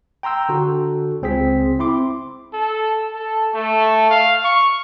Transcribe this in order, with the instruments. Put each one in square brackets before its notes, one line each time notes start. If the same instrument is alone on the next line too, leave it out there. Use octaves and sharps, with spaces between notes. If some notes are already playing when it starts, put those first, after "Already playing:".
[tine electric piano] G5 A#5 C6 E6 G6
D3 F#4 A4
C#2 C4 G#4 B6
C4 E4 C6 D6
[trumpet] A4
A4
A3
F5
C#6